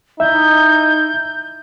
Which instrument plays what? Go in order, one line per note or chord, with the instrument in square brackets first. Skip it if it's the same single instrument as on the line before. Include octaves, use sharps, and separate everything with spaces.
[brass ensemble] D#4 E4 [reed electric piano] E5 [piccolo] G6